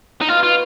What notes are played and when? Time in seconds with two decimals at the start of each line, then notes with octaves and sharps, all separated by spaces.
0.21 D#4
0.29 B2 F4
0.43 F4